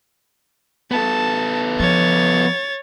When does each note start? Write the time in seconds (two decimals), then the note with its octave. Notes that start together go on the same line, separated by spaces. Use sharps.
0.91 B3 A4 A5
1.80 F3 C#5 A6